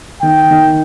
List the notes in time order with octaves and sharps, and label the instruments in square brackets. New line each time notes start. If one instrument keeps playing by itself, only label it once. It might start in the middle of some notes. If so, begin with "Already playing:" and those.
[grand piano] D#3 [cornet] G5
[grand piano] D#3